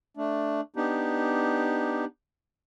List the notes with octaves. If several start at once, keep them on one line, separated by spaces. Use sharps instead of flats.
A3 D4
B3 D4 D#4 G4